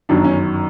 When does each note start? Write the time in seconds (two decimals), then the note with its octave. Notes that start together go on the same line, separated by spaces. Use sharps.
0.09 G1 F#2 D#3 F#3 D4
0.25 C#4